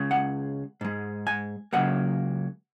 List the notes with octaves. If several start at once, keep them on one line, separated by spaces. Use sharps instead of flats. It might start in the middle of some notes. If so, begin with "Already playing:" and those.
Already playing: C#2 C#3 G#3
F#5
G#2 G#3
G#5
C#2 C#3 F#3 A#3 F#5